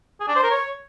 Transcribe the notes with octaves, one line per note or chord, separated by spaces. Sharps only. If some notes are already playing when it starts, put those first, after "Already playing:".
G#4
D4
C5
A#4
C#5